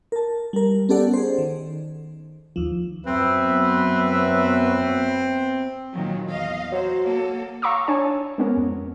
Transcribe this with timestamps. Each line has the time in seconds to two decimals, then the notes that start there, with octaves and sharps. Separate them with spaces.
0.12 A#4 A5
0.53 G3 A#4
0.89 B3 C#4 G4 A4 D5 F#5
1.14 G#4 C5
1.38 D#3
2.56 D#2 F3
3.06 F#2 F#3 B3 C4 B4 E5
5.92 A#2 D#3 F#3
6.29 E2 D#5 F5
6.72 F#3 C5
7.05 A#3 A4
7.62 F5 A#5 C#6 D6 E6
7.88 D4 C#5 G#5 A5
8.38 G#3 B3 C#4 A#4
8.57 F2